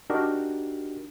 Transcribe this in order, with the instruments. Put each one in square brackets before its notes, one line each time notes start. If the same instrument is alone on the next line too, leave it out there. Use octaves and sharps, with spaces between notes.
[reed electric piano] D4 D#4 F#4 G4 A#4